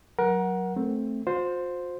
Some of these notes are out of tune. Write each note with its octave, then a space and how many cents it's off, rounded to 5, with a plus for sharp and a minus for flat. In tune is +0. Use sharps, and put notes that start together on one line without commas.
F#3 +0 A#4 +25 F#5 +0
A3 +0 C4 +5
F4 +45 C5 +0